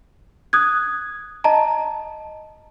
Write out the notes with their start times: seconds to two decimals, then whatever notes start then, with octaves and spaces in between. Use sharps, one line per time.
0.53 D#6 F#6 G#6
1.44 D#5 A5 A#5